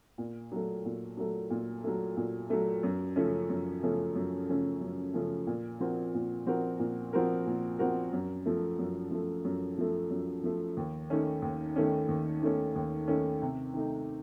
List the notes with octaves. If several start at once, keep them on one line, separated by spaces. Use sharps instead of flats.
A#2
F#3 A3
A#2
F#3 A3
A#2
F#3 A3
A#2
F#3 A3
F#2
C#3 F3 A3 C#4
F#2
C#3 F3 A3 C#4
F#2
C#3 F3 A3 C#4
F#2
C#3 F3 A3 C#4
A#2
F3 C4 F#4 A#4
A#2
F3 C4 F#4 A#4
A#2
F3 C4 F#4 A#4
A#2
F3 C4 F#4 A#4
F#2
F3 A3
F#2
F3 A3
F#2
F3 A3
F#2
F3 A3
D#2
D#3 A3 C#4
D#2
D#3 A3 C#4
D#2
D#3 A3 C#4
D#2
D#3 A3 C#4
C3
D#3 A3 D#4